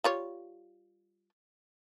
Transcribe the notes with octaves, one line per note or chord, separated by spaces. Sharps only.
G3 F4 C#5